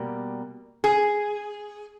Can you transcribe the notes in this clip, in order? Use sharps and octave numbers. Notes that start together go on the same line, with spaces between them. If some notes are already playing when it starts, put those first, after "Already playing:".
Already playing: B2 G3 A#3
G#4